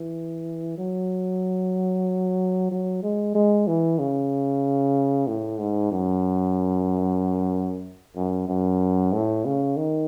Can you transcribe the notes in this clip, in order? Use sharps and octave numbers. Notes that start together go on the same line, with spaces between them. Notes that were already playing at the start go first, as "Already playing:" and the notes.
Already playing: E3
F#3
F#3
G#3
G#3
E3
C#3
A2
G#2
F#2
F#2
F#2
A2
C#3
D#3